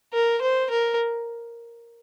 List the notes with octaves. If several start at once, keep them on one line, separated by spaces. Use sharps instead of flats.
A#4
C5
A#4